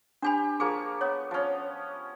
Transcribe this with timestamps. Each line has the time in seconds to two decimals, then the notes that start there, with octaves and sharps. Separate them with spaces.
0.22 D4 G4 C5 G#5 B5
0.60 F3 A#3 G#4 C#6
1.01 B3 C#5
1.31 F3 C#4